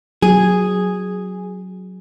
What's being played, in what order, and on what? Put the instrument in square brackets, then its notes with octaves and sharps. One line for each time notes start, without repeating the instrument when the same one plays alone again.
[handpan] F#3 [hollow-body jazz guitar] G#4